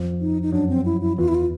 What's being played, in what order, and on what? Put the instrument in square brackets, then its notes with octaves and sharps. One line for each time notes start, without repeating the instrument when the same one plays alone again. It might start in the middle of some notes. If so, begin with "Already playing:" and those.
Already playing: [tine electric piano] F2 F3
[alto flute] D#4
D#4
[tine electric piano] F#2 F#3 [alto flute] D4
[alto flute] C4
E4
E4
[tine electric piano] E2 E3 [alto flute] F4
[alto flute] E4
F4